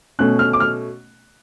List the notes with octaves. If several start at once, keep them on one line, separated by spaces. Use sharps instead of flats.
B2 A3 C#4 F#6
F6
D6
F6